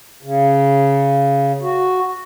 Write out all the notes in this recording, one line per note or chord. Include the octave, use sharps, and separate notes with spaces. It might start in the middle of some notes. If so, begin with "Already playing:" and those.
C#3
F#4